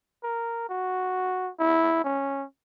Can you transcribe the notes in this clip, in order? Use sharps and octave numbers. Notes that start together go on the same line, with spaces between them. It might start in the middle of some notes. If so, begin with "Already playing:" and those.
A#4
F#4
E4
C#4